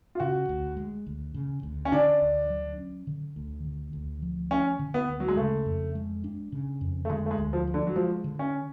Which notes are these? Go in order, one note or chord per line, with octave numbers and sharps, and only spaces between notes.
F4
C#3 F#4
D2
G#3
D2
C#3
D2
C#4
D3 D4
D2
F#3
C#4
D3
D2
D3
D2
F3
A3 C#4
D3
B3
D2
F#3
G#3
C#3 A3
F2
G#3
D4
C#3
F2
A3
D3 G#3
A3
G#3
D2
F3
F3
D3
F#3
F3 G#3
D3
C#4